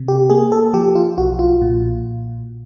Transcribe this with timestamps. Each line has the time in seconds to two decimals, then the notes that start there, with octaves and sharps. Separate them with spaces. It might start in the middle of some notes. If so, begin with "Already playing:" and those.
Already playing: C3
0.08 G4
0.30 A#3 G#4
0.52 A4
0.74 F3 G4
0.95 F4
1.18 B1 F#4
1.39 F4
1.62 A#2